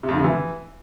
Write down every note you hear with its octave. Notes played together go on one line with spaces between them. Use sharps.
C3
F2
D3
C3
E3